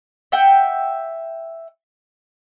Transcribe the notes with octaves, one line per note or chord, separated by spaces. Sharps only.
E5 F#5 G5